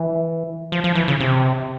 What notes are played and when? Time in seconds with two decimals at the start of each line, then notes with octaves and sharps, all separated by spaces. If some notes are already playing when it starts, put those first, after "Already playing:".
Already playing: E3
0.72 F3
0.84 F3
0.95 E3
1.08 C#3
1.20 C3